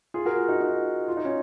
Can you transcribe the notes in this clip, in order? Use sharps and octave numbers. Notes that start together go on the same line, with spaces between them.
F4 G#4
F#4 A#4
F4 G#4
D#4 F#4
D#4 F#4
F4
D#4
C#4